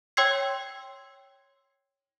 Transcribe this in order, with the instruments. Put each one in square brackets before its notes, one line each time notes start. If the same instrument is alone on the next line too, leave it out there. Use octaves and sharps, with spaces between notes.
[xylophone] C#5 G5 C6 E6 G#6 C7